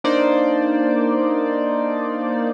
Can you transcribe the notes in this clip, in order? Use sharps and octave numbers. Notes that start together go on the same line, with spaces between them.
A#3 D4 D#4 C5 D5